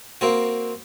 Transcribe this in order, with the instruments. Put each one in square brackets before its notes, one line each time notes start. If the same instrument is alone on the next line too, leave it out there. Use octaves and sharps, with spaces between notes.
[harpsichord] A#3 C4 F#4